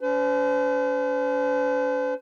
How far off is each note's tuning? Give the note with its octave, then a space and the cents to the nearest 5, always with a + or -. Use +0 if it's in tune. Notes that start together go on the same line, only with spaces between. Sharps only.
C#4 +40 C5 -45